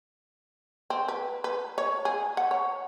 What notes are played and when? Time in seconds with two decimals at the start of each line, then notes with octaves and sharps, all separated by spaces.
0.90 C4
1.08 B4
1.44 B4
1.78 C#5
2.05 G#4
2.37 F#5
2.51 C#5